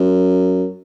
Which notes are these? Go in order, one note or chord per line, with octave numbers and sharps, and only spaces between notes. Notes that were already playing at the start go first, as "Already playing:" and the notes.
Already playing: F#2